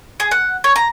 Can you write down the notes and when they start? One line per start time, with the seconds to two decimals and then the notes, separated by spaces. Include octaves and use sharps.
0.20 G#4
0.31 F#5
0.64 C#5
0.76 A#5